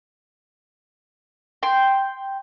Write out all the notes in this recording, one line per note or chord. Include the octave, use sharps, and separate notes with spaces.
G5 C6